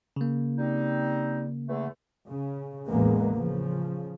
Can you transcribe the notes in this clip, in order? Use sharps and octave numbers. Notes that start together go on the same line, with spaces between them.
C#3 A#3
G3 C4 D#4
E2 D3 A3
C#3
A1 E2 A2 G#3 A#3 B3
C#3 F3